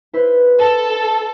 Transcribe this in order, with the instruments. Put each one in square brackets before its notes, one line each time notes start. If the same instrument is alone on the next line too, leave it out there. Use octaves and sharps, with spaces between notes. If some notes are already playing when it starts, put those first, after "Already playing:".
[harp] E4 B4 C5
[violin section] A4